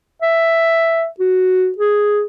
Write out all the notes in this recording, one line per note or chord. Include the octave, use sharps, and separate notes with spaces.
E5
F#4
G#4